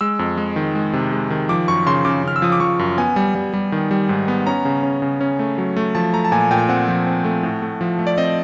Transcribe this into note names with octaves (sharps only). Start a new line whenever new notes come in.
G#3 E6
F2
G#3
D#3
G#3
C3
G#3
D#3
F3 D6
F#2 C#6
C#3 C6
C#3 D6
C#3 F6
E6
F3 D#6
D6
F3 C#6
F#2
B3 G#5
G3
G3
G3
D#3
G3
G#2
B3
C#4 A#5
C#3
C#4
C#3
C#4
A3
F#3
A3
F3 A5
A3 A#5
A5
A#2 G#5
A#2 G5
C4 F#5
F3
C4
A3
A2
A3
F3
A3
D5
C4 D#5